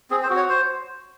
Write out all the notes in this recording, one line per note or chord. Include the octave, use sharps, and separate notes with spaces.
C4 G#4
C5
F#4
C#5
C5